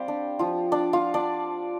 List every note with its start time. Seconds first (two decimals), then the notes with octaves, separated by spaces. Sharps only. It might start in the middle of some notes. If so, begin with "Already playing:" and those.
Already playing: G3 C4 G4 C5 D5 F5
0.08 D4
0.39 F3 F4
0.72 D4 D5
0.93 F4 F5
1.14 D4 D5